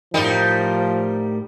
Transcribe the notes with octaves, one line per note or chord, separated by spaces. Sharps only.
A2 F3 G3 D#4 G4 A#4